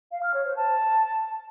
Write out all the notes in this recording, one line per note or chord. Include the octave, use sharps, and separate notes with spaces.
F5
F6
C#5
C5
A5